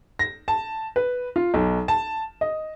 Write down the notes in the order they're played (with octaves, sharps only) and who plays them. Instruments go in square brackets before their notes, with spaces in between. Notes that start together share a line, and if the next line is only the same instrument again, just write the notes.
[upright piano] A#6
A5
B4
F4
B1
A5
D#5